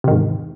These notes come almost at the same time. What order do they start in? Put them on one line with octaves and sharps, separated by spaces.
C3 D#3 G#2 E2